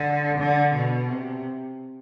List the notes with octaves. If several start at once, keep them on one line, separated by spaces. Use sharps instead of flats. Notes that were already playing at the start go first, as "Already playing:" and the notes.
Already playing: D3
D3
B2
C3